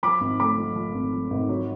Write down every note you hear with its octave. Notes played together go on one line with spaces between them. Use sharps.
F3 B5 D6
G#1
A3 B5 D6
F3
F3
G#1
F3
G#1
F#3